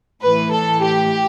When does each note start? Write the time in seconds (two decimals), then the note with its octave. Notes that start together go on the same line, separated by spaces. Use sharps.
0.22 A2 E3 B4
0.53 A4
0.83 G4